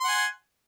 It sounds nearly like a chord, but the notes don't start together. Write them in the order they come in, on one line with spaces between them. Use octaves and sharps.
C6 F#5 G#5